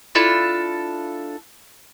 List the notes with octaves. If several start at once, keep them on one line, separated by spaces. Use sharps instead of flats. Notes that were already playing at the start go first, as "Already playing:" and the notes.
D4 E4 F4 A4